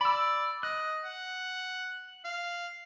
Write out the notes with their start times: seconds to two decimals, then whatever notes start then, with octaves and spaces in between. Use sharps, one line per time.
0.01 D5 B5 E6
0.63 D#5 F#6
1.05 F#5
2.25 F5